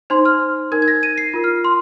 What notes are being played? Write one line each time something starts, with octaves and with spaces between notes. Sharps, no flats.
D#4 C5 C6
F6
D#4 A#4 G#6
G#6
A#6
D#7
C7
F4 A#4
F6
C6